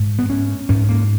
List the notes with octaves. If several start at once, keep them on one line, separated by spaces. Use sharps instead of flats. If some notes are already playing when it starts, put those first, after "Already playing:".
Already playing: G#2
B3
C#4
G#2 C#4
A#3